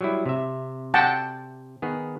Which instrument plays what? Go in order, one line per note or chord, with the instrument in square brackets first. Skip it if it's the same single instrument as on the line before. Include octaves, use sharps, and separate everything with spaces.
[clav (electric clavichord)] F#3 G3 E4
C3 E5
[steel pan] F#5 G5 A5
[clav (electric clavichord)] D#3 B3 G#4